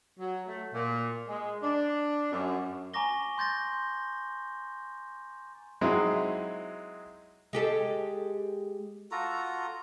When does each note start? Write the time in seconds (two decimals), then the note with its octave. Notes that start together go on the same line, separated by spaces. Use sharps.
0.20 F#3
0.47 A3
0.74 A#2
1.28 G#3
1.63 D4
2.32 F#2
2.94 G#5 A#5 C#6 D6 A#6 G7
3.38 C6 G6 A6 A#6
5.81 F#3 G#3 C4 D#4 E4
7.53 G#3 G4 A4
9.11 F4 F#4 A4 A#5